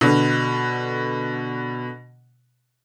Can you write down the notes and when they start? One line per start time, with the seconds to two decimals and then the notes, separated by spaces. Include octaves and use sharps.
0.01 B2 D3